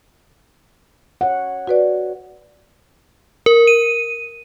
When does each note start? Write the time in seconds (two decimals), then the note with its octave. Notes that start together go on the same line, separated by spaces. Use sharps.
1.21 C#5 F#5
1.67 F#4 B4 D5
3.46 A#4
3.67 D#7